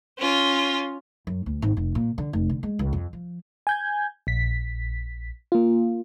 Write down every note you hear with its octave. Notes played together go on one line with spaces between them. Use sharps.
C#4 F4
F#2
D2
G#1
F1
A#2
D3
F1
D3
G#3
C#2
F2
F3
G#5 G6 G#6
A#1 B6
A#3 F4